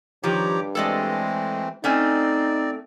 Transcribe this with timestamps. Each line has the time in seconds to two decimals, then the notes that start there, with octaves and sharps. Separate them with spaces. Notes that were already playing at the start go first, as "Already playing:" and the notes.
0.24 G2 D#3 F3 G4 C#5 A#5 D6
0.75 E3 G#3 A3 C4 A4 D5 D#5
1.84 A3 C4 C#4 D#4 D5 G#5